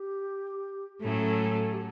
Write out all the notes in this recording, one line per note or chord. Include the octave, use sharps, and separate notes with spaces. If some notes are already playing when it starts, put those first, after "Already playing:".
Already playing: G4
A2 F#3 A3 C#4 A4
G4